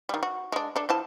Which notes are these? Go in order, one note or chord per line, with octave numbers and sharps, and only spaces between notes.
D#3 G3
F#4
G#3 D4
D4 A4
F3 E4 A5